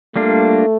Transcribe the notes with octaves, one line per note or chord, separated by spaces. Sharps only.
G3 A3 A#3 D4 F4